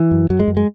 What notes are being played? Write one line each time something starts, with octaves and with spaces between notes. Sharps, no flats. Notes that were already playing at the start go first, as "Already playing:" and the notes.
Already playing: E3
F#2
F#2 F#3
G#3
F#2
G#3